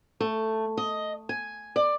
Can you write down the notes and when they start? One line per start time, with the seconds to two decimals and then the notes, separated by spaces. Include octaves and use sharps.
0.20 A3
0.77 D#5
1.29 G#5
1.76 D5